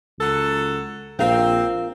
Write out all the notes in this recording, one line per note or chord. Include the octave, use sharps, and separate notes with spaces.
C#2 F#3 A4
A#1 C4 F4 A#4 F5